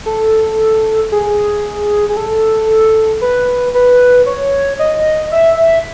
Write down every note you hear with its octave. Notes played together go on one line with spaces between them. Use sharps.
A4
G#4
G#4
A4
B4
B4
C#5
D#5
E5